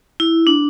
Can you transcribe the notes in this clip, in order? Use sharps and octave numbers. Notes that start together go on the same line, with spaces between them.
E4
D4